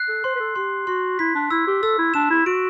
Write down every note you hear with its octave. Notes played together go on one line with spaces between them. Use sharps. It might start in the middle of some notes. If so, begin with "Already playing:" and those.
Already playing: F#6 C7
A4
C5 C6
B4
A4
G4 C6
F#4 C6
E4 B6
D4
E4 E6
G4
A4 E6
E4
D4 E7
E4
F#4 D7